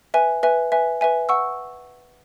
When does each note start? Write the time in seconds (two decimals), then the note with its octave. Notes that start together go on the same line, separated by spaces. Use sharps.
0.14 B4 E5 G#5
0.43 B4 E5 G#5
0.72 B4 E5 G#5
1.01 B4 E5 G#5
1.29 F#5 C#6 E6